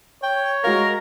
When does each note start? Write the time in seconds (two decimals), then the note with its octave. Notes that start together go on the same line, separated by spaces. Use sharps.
0.23 C#5 G5
0.64 G#3 F#4 A#4 F5 A#5